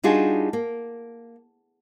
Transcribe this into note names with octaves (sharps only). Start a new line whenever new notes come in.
G3 D4 D#4 F4 F#4 G#4
A#3